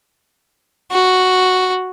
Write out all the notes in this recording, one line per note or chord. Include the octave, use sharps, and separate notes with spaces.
F#4